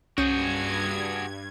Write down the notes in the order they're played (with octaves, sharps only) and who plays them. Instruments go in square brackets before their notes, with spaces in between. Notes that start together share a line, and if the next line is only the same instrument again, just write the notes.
[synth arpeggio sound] C2 C#4 G6 [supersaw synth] G2 G#6 [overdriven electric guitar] F#4 G#4